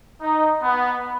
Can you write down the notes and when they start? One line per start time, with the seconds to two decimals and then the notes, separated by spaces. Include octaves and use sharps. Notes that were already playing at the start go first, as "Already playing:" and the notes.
0.22 D#4
0.63 B3